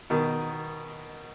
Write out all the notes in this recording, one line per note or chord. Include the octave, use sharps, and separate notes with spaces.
B2 D#3